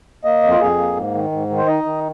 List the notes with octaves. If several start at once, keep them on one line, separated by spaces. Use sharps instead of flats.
A#3 D#5
F2
F4
F2 G#4
A#3
G#2
D#3
G#2
D#3
C5
D#4 D#5
D#3